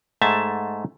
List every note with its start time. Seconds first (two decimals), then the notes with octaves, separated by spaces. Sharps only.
0.22 G#2 A3 G#4 E5 A5